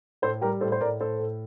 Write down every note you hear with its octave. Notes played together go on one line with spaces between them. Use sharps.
A2 A4 C5
G3 G4 A#4
A2 A4 C5
C5
A2 A#4 D5
A2 A4 C5
A2